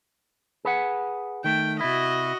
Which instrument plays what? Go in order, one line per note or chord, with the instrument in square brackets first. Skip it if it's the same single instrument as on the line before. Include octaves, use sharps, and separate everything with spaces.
[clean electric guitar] G#4 B4 F#5
[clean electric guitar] D#3 A3 [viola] G5
[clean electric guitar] C3 E4 [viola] F#4 D#5